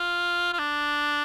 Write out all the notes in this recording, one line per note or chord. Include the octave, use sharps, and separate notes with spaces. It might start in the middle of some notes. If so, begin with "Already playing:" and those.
Already playing: F4
F4
D4